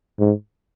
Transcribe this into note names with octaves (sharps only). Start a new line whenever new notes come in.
G#2